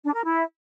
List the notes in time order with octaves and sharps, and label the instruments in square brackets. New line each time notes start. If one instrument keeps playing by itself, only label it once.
[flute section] D4
A#4
E4